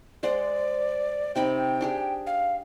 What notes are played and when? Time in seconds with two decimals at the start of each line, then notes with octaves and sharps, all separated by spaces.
0.23 G#3 C5 D5 F#5
1.36 C3 D#4 G5 B5
1.81 D4 G4 G#4
2.27 F5